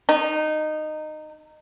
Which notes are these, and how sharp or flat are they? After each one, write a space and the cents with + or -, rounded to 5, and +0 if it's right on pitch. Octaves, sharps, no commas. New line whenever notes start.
D#4 -15